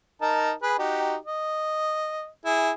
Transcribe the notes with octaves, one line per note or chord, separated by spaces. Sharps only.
D#4 A#4 A5
G#4 B4
D#4 F#4 G4
D#5
E4 G#4